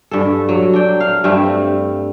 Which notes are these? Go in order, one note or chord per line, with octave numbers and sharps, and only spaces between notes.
G2 A4
F#3
D4 G5
F5
G2 A3 C4